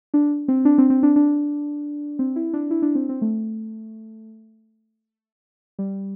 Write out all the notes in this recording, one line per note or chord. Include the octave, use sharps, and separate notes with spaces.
D4
C4
D4
C4
C4
D4
D4
C4
E4
D4
E4
D4
C4
C4
A3
G3